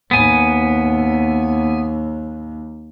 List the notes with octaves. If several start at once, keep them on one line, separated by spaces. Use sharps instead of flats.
D#2 B3 G#5